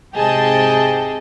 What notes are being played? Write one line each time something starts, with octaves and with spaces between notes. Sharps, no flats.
G#2 C3 G#4 D#5 G5 A5